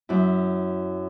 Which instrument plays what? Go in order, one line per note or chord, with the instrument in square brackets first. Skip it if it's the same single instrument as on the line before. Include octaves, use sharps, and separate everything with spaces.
[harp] F#2 E4